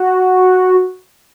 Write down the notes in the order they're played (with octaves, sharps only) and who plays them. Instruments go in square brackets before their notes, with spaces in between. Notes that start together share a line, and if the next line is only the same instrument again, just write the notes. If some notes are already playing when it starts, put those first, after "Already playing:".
Already playing: [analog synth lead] F#4